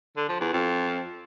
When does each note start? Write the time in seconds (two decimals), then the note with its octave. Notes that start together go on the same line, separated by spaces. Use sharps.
0.17 D3
0.29 F3
0.41 E2
0.53 F2